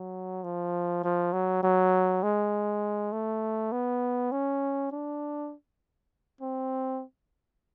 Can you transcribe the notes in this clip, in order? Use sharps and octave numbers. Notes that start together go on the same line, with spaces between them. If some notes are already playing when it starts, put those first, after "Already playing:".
Already playing: F#3
F3
F3
F#3
F#3
G#3
A3
B3
C#4
D4
C4